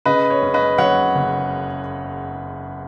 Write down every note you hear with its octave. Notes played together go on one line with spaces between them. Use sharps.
C#3 B4 D#5
C#5
F#2
B4 D#5
F#3 C#5 F#5
F#1